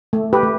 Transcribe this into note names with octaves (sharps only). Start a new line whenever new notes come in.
A3
G4 B4
A3